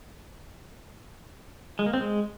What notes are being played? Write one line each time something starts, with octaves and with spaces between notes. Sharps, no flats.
G#3
A#3
C4
G#3